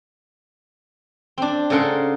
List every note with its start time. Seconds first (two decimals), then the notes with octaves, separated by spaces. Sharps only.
1.38 C4 D4
1.70 C#3 A4 A#4 F#5 C6